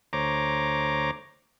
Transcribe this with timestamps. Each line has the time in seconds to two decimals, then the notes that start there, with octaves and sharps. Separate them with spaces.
0.13 D2 C5 C#5 A#5 D6